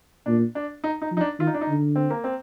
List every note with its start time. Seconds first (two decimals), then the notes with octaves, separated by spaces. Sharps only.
0.26 A#2 D4
0.55 D4
0.84 D#4
1.02 D#4
1.11 F3
1.17 D#4
1.21 D4
1.39 D#3 F4
1.47 D#4
1.54 D4
1.61 D#4
1.68 D3
1.96 C4
2.11 A#3
2.24 C4